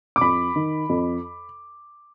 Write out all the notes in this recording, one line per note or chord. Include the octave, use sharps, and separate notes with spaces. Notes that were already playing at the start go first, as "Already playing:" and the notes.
D6
F2 B5
D#3
F2